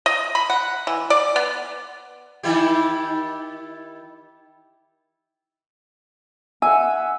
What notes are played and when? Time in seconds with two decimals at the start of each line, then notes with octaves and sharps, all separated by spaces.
0.06 D#5
0.35 B5
0.50 F#5
0.87 E3
1.10 D5
1.36 B3
2.43 D#3 E4 G4
6.62 E5 F#5 G#5